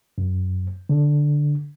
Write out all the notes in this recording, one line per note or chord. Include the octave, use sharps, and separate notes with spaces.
F#2
D3